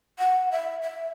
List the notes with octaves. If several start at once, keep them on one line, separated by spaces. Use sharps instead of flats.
F#5
E5
E5